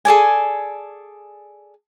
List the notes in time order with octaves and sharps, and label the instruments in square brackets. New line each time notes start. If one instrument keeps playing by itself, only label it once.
[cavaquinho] G#4 A4 D5 G#5